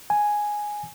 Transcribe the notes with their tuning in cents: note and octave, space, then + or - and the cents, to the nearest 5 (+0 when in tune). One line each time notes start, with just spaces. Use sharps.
G#5 +0